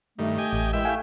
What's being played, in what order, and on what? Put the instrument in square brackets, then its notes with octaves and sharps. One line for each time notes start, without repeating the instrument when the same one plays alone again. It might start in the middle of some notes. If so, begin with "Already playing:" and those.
[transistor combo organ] G2 D#3 [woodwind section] A3
[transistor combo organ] G4 D#5 G#5
[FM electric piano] A1
[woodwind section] D#3 E3 G#3 [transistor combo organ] E4 G4 E5
[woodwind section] A3 [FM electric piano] F5 G5 G#5